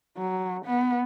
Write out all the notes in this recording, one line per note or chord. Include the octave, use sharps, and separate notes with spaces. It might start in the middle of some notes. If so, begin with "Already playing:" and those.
F#3
B3